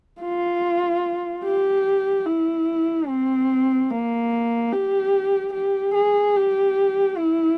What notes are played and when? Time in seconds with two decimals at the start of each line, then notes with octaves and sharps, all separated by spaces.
0.21 F4
1.44 G4
2.26 E4
3.08 C4
3.90 A#3
4.73 G4
5.53 G4
5.94 G#4
6.36 G4
7.17 E4